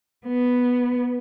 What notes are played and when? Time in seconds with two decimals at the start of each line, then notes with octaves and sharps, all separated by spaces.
0.27 B3